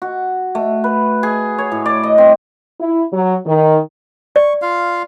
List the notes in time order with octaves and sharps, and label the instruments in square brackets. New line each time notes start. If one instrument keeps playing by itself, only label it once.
[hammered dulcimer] F#4
A3
B4
G#4
C#5
A2
D5
D#5
C4
[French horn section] E4
F#3
D#3
[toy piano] D5 [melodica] C#6
[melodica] F4 F5